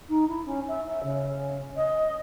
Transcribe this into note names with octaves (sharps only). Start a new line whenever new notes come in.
D#4
E4
C#4
E5
E5
C#3
D#5